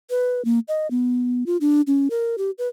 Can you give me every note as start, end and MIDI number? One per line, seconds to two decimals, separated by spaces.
0.10 0.44 71
0.45 0.59 58
0.68 0.90 75
0.91 1.44 59
1.46 1.57 65
1.61 1.81 62
1.87 2.08 61
2.10 2.36 70
2.38 2.51 67
2.58 2.68 71